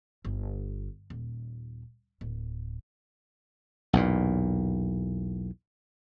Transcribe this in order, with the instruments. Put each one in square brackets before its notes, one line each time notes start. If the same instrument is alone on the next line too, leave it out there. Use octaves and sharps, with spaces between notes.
[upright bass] G1
D#1
D1
[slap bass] B1 E2 A#2